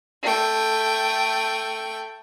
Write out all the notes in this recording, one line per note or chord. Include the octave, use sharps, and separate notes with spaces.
A3 G5